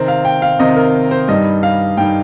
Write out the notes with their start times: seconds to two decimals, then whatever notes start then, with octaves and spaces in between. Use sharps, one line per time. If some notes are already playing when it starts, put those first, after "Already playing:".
Already playing: C3 D#3 C4
0.08 F5
0.25 G5
0.42 F5
0.59 C3 D#3 C4 D#5
0.77 A#4
1.11 C5
1.28 G2 G3 D#4 D#5
1.63 F5
1.97 G2 G3 D#4 G5